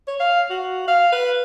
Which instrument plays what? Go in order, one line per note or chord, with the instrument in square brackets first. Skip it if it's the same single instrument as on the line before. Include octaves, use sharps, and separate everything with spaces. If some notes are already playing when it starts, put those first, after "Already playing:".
[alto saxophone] C#5
F5
F#4
F5
B4